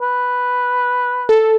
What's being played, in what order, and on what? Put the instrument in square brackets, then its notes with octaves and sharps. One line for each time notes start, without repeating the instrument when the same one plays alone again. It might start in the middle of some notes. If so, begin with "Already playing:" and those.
[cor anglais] B4
[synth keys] A4